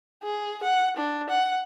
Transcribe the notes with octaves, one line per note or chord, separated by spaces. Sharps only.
G#4
F#5
D4
F#5